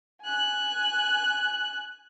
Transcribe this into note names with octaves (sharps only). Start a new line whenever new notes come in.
G#5 F#6